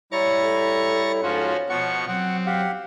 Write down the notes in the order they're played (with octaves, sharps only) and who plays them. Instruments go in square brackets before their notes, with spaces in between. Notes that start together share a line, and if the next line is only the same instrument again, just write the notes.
[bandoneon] G3 E4 [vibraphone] C#5 [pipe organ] A#5 C#6 A6
[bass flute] A4
[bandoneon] G#2 F4 [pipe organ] F3 C#4 F#4
[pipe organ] B2 F3 C#6 [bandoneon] F#5
[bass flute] F#3 [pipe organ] C4 [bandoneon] F#5
[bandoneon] G4 F5 F#5